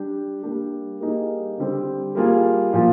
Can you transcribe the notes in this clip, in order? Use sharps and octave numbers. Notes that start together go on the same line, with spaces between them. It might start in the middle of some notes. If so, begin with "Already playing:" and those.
Already playing: G3 D4 G4
G3 A#3 D4 G4
G3 A#3 D#4 G#4
D3 G3 C4 G4
G3 A#3 F4 G#4
A#2 F3 A#3 F4